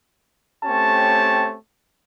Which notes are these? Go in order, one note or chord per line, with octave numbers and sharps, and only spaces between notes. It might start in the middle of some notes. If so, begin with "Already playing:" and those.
A3 C4 C#4 G4 C#5 A5